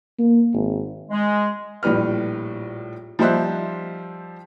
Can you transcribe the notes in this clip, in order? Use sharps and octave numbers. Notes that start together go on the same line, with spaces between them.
A#3
G#1
G#3
A#1 A2 G3 B4 F6
F3 G3 D#4 C5 E5 F#6